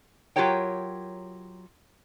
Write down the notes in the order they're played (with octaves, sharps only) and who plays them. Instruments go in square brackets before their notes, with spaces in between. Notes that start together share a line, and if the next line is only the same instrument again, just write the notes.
[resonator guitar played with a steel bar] F#3 F4 G4 A#4 C#5 G5